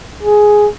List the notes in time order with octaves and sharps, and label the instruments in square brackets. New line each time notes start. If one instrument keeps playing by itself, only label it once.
[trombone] G#4